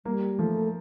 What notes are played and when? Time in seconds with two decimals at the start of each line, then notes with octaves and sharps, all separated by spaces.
0.05 G3 A#3
0.39 F3 A3